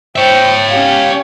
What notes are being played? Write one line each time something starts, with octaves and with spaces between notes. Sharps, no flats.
C5 C#5 E5 G5
C#4 G4 F5